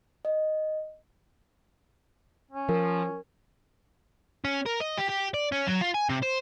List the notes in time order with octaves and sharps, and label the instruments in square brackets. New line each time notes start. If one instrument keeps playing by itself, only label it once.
[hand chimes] D#5
[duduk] C#4
[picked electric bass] F3 [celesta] A#4
[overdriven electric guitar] C#4
A#4
D#5
G4
G4
D5
C#4
F#3
F4
G#5
C3
C5